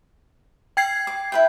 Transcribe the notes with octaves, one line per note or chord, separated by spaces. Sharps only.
G5 G#6 C7
D6
E4 B4 G5